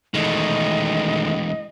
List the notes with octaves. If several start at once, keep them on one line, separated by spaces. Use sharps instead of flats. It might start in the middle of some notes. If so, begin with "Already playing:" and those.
D#3 E3 G#3 A3 D#5